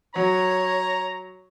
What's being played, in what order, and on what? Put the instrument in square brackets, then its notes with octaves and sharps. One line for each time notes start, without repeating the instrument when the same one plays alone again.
[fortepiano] F#3 [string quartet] C#5 [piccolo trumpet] A#5